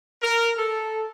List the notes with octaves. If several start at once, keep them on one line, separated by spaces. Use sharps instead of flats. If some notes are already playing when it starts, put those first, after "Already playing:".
A#4
A4